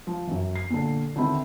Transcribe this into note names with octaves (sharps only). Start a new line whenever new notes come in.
F3
F#2 E3
C7
A#2 D3
D3 D#3 B3 C4 E4